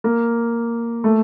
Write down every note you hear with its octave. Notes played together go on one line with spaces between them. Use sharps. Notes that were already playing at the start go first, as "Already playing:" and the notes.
A#3
A3